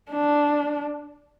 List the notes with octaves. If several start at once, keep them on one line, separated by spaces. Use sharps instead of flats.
D4